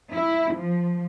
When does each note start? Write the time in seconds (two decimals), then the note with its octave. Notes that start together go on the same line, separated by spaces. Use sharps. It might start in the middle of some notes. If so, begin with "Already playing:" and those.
0.13 E4
0.55 F3